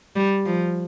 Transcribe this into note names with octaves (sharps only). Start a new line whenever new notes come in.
G3
F3